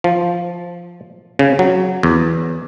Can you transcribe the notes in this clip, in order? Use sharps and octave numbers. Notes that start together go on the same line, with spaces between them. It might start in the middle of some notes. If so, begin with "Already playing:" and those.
F3
C#3
F#3
E2